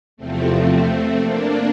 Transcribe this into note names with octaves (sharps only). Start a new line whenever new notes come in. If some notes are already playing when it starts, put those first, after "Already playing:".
E2 C3 F3 A3 C4
A3 C4
A#3 D4